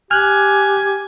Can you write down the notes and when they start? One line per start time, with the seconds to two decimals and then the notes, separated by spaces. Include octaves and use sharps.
0.11 G4 G#5 F6 F#6